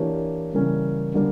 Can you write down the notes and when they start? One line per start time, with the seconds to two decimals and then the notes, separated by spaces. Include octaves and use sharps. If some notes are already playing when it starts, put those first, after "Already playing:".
Already playing: E3 A#3 D4 G4 C#5
0.53 C#3 E3 G3 A#3 C#4
1.14 D3 G3 A#3